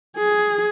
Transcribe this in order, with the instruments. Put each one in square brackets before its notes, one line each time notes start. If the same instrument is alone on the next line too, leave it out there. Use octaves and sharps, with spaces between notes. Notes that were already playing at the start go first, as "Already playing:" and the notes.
[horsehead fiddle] G#4